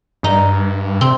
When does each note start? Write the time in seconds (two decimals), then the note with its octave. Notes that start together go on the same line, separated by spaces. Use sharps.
0.23 G2 D#4
1.01 C3 C4